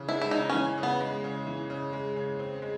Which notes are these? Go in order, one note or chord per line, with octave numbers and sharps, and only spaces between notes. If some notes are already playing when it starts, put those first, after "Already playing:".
Already playing: C#3 E3
G#3 E4
E4
C#3 D#4
E3 C#4
C#3
B3
G#3
C#3
E3
C#3
G#3
C#3
C4
G#3